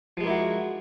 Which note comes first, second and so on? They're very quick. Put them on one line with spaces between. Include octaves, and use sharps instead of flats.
F3 G#3 A#3 E4 F#4